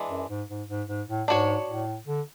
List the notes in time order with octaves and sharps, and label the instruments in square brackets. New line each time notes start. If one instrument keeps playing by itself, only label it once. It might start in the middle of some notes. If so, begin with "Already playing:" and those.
Already playing: [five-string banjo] E3 G#3 D4
[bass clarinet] F#2
G#2
G#2
G#2
G#2
A2
[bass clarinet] G#2 [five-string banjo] D4 F#4 C#5
[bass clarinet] A2
D3